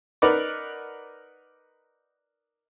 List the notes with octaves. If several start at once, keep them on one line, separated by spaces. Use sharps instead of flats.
D#4 A#4 B4 D5 F#5 D6